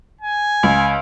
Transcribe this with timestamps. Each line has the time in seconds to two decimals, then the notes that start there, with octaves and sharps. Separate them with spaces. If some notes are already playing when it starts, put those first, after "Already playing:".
0.21 G#5
0.63 C#2